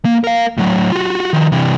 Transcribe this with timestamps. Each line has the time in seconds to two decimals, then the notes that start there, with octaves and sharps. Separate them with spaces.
0.05 A#3
0.24 A#4 F5
0.58 A2 F#3
0.92 F4 F#4
1.33 D#3 F3
1.52 C3 E3